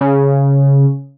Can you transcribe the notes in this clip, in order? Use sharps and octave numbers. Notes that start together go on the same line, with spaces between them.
C#3